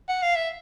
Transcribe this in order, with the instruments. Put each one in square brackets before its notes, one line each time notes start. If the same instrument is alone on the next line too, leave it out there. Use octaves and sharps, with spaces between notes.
[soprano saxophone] F#5
F5
E5